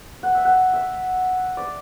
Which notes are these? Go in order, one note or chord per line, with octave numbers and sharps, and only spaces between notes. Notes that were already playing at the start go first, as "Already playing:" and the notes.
F#5
E5
F#5
E5
D5